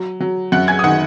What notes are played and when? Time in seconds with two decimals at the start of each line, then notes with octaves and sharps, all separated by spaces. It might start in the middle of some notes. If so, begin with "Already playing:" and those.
Already playing: F#3
0.21 F#3
0.52 F#2 F#5 F#6
0.68 G#5 G#6
0.79 D#6
0.84 D#3 F#5 F#6